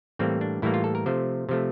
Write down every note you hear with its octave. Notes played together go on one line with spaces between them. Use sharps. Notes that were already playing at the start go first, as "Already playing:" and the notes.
A2 E3 G3 A#3 C4
D4
A2 E3 G3 A#3 E4
F4
A4
A#4
C3 F3 A3 C5
C3 F3 A3